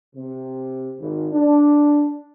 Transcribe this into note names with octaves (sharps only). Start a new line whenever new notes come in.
C3
G#1
D4